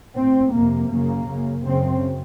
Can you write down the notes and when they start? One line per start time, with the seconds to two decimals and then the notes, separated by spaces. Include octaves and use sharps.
0.16 A2 C4
0.53 F2 C3 A#3
0.90 F#2 C#3 A#3
1.27 F#2 C#3
1.64 F#2 C#3 C4